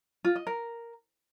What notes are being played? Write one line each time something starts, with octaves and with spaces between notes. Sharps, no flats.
F4
D#5
A#4